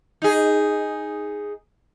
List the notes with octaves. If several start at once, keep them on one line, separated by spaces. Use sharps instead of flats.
D#4 G#4